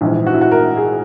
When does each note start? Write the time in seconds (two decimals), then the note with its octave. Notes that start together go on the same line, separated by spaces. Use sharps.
0.01 A#1 G#2 E3
0.27 F#4
0.34 E4
0.41 F#4
0.51 A#4
0.77 G#4